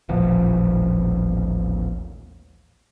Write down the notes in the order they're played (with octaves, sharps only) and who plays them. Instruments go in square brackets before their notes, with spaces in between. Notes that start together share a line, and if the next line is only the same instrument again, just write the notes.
[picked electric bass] D#1 A1 A#2 F3